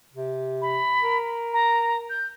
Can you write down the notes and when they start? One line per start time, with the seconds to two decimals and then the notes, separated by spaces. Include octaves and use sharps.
0.14 C3
0.62 B5
1.02 A#4
1.53 A#5
2.10 G6